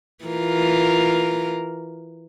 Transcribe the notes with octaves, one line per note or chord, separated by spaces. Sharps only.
E3 F4 A#4